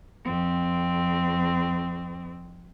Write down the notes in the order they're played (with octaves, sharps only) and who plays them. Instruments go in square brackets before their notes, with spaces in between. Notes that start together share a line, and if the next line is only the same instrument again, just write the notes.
[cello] F2 C4